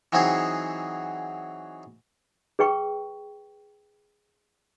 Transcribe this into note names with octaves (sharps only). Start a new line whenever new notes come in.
E3 F#3 C4 D#4 G#4
G#4 B4 G5 C#6